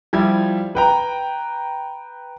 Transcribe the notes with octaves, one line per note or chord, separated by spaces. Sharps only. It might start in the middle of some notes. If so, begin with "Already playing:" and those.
F3 G3 E4 G#6
B4 G5 A#5